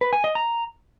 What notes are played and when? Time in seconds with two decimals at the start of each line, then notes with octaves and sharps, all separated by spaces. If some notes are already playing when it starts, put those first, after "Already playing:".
0.01 B4
0.13 G#5
0.24 D#5
0.35 A#5